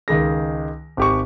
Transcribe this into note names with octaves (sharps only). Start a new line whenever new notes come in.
C#2 D#3 G#4 A#6
G#1 G4 C#6